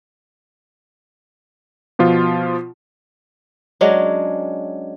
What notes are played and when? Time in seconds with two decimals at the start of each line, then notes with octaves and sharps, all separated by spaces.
1.99 B2 F3 F4
3.81 F#3 G#3 C#4 D4